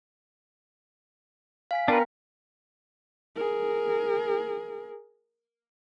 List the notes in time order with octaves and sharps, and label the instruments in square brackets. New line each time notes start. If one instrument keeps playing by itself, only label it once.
[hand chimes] F5 G#5 B6
[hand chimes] B3 G5 [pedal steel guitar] D4 F4 B4 [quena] A#4
[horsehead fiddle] G#4 A#4